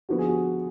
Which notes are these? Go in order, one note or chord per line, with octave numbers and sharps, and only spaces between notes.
D3 F3 B3 F#4
G#4
F#4